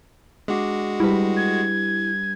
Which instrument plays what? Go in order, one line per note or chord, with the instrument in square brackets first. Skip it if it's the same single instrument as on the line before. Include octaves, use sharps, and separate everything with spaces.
[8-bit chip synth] G#3 F#4 [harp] D4
[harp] G3 B4 [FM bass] E4
[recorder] G#6